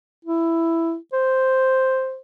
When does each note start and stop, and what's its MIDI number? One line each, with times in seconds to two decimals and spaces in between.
0.25 0.96 64
1.13 2.19 72